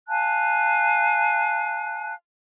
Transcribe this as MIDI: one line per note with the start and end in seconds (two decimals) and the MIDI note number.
0.09 2.14 77
0.09 2.14 80
0.09 2.14 81
0.09 2.14 90